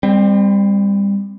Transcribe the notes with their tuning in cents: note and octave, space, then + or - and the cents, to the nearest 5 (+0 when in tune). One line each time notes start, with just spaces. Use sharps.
G3 +30 C4 +0